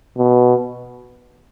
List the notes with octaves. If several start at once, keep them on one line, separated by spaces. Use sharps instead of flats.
B2